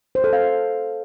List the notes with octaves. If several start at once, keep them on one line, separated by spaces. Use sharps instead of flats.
C5
A4
F5